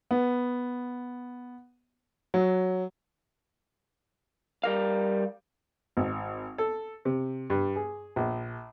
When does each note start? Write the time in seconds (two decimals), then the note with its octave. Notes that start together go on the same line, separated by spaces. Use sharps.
0.11 B3
2.34 F#3
4.64 G3 A#4 F5
5.97 G#1
6.58 A4
7.05 C3
7.50 G2
7.76 G#4
8.16 A#1